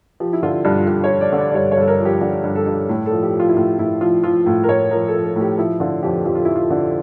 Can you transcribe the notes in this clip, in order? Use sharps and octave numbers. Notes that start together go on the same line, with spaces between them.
F3 G4
E4
D3 F4
G2 G4
F4
G2 G4
C#5
F3
D5
D3
D5
D5
G2 C#5
C#5
G2 A4
A#4
F3
G4
D3 G4
G2
A4
G2
A2
A4
F3
G4
F3
F4
E4
A2 F4
A2 E4
F3 F4
F3 F4
A2 F4
A#4
A2 C#5
F3 A#4
A4
F3
A4
A2
G4
F3 E4
D3 F4
F2 G4
F2 G4
F4
F3 E4
F4
D3